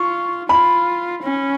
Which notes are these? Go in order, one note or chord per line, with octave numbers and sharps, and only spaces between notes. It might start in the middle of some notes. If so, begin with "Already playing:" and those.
Already playing: F4 C#6
F4 B5
C#4